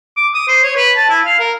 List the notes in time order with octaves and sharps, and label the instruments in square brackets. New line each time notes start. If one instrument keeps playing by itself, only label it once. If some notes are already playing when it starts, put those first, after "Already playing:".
[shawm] D6
D#6
C5
C#5
B4
A5
E4
F5
A#4